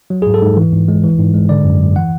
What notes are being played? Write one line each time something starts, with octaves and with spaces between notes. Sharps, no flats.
F#3
G#4
G#2
A4
G#2
E3
G#2
G#3
E3
G#2
G#3
D3 D5
F#2
F#3
E3 F#5